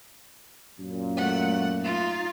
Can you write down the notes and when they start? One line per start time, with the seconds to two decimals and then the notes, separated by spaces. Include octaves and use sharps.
0.80 F#2 A#2
1.17 A3 F#5
1.81 D#4 F4